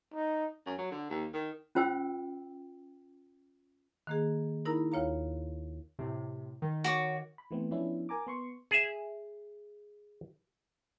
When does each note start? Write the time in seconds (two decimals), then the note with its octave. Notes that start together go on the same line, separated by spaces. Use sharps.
0.14 D#4
0.66 F#2
0.78 F#3
0.91 D3
1.10 D#2
1.34 D#3
1.75 C#4 F4 C5 G5 E6
4.07 D#3 A#3 G#4
4.65 D#4 E4 A#4 A#5 B5
4.92 D#2 F4 C#5 F5 A#5
5.99 A2 C3
6.62 D#3
6.84 F#4 C#5 D6
7.38 B5
7.51 E3 A3 B3 C4
7.71 F3 B3 C#4 D4 E4
8.09 A#4 G#5 A#5 D6
8.27 B3 C6 C#6
8.71 G#4 E5